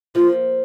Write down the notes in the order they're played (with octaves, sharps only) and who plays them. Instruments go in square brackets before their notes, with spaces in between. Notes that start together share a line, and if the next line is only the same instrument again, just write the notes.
[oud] F3 A#3 [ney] F4